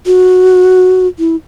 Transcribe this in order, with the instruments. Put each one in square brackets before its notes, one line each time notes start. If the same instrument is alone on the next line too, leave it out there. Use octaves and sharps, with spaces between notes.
[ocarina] F#4
E4